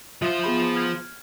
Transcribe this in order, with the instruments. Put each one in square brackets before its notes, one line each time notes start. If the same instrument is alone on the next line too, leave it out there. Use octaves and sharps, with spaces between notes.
[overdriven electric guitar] F3 C5 [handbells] F4 E5
[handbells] B3 G#4 B5
F6 G#6